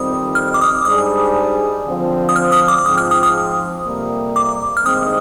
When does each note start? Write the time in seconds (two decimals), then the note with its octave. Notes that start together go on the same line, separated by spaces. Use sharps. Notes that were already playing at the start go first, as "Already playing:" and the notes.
Already playing: F2 D#3 G3 C4 D#6
0.35 F6
0.54 D6
0.61 D#6
0.85 G#2 G3 D4 G#4 D#6
1.86 D3 F3 C4
2.29 D#6
2.36 F6
2.52 D#6
2.68 D6
2.85 G#2 F3 C4 D#6
2.98 F6
3.11 D#6
3.23 D#6
3.86 F2 C3 G3 A#3
4.36 D6
4.77 F6
4.85 G2 D#3 G#3 C4 D#6